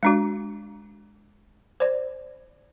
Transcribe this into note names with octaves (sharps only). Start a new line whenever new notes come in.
G#3 D4 F#4
C5 D5